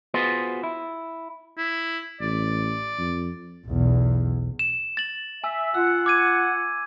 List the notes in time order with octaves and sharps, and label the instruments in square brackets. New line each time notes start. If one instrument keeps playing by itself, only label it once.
[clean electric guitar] B3 F4 F#4 G#4 B4 C5
E4
[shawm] E4
[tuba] A1 [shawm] D5
[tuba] F2
[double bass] B1 E2
[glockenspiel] E7
A6 F#7
[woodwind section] E5 [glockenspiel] G#5 E6
[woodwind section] F4 F#5 [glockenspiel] E6
[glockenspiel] D6 G#6 D#7